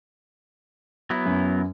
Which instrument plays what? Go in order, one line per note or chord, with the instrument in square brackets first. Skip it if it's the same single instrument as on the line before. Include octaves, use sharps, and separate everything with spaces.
[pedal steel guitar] F#3 B3 E4
[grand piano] F#2